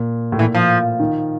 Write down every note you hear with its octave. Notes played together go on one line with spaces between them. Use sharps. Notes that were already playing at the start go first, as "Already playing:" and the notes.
Already playing: A#2
A2
A#2 E3
F3
D#3